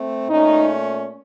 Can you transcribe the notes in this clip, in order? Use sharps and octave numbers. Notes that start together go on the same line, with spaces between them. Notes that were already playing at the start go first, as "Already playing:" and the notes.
Already playing: A3 C4
A#2 A3 C#4 D#4